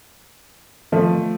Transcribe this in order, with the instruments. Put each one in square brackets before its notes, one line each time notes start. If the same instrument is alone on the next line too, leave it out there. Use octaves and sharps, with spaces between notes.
[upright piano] F3 A3